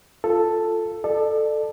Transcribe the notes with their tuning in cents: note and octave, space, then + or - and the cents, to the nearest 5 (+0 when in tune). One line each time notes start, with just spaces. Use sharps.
F4 +0 A4 +5
A4 +0 D5 +35